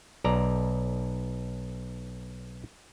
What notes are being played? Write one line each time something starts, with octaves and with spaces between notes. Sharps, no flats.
B1 D5 A#5